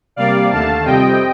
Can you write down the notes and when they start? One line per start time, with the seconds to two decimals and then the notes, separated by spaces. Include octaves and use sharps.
0.16 C3 G3 A#3 D5 F5
0.51 D#2 D3 A3 F5 A5
0.85 F2 C3 G3 C4 D#5 G5